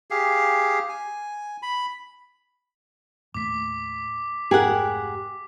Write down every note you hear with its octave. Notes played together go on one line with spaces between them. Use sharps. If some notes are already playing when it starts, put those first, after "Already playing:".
G4 G#4 F5
G#5
B5
D#2 A2 A3 D6 B6
F1 G#2 G4 G#4 A#4 F#5